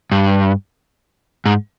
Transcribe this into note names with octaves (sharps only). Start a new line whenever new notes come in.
G2
G#2